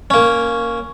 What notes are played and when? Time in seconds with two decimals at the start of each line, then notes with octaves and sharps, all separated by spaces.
0.10 A#3 C#4